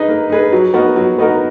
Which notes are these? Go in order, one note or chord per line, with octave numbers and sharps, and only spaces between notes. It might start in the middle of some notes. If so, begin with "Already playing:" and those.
Already playing: D#4 G#4 B4
A#3
D#4 G#4 B4
F#3
B3 D#4 F#4 A#4
F#3
B3 D#4 F#4 A#4